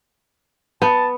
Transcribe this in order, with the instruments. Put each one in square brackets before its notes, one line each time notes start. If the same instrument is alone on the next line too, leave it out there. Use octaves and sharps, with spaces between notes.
[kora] B3 [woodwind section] A5